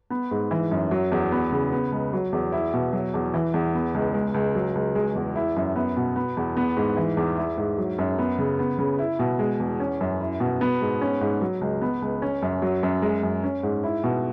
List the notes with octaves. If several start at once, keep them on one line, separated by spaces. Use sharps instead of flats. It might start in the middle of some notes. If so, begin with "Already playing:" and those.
B3
G#2
E3
F#2
F#3
E2
B3
C#3
B3
C#2
F#3
E2
E4
B2
F#3
E2
E3
E2
B3
C#2
G#3
C#2
F#3
C#2
G#3
E2
E4
F#2
B3
B2
B3
E2
B3
G#2
E3
E2
E4
G#2
F#3
F#2
B3
C#3
B3
C#3
E4
B2
G#3
E2
C#4
F#2
E4
B2
B3
G#2
C#4
G#2
F#3
C#2
B3
C#2
C#4
F#2
F#3
F#2
G#3
F#2
C#4
G#2
E4
B2